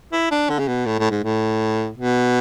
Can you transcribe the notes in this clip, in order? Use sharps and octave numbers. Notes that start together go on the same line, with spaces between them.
E4
D4
D3
C#3
B2
A2
A2
G#2
A2
B2